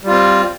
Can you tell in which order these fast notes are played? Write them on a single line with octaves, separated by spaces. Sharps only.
G3 F4 C4